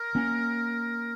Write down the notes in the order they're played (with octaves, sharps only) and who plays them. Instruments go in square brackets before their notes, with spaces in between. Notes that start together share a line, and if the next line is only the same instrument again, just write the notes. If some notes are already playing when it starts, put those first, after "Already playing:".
Already playing: [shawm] A#4
[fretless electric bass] A#3 C#4